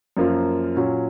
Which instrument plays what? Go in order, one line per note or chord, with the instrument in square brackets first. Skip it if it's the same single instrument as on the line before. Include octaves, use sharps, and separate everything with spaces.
[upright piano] F#2 F3 A#3 F4
A#2 F#3 C#4